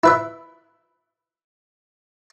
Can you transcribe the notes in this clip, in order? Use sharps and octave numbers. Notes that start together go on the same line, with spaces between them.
E4 B4 E5